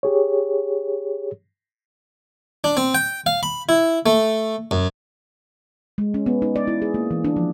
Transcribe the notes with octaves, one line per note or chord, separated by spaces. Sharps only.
G4 G#4 C#5
D4
C4
G5
F5
B5
E4
A3
F#2
G#3
C#4
B3
D#4
D5
E4
G#4
A#3
E3
D4
F3